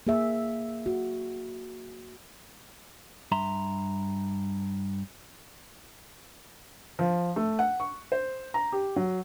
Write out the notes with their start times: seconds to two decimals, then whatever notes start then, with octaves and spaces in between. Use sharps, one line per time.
0.07 A#3 G#4 E5
0.86 F#4
3.32 G2 E5 A#5 C6
6.99 F3
7.36 A3
7.59 F#5
7.80 C#6
8.12 C5
8.54 A#5
8.72 G4
8.96 F#3